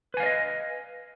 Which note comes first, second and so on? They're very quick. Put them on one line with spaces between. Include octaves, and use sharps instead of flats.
B4 G#5 F5 D5 D#5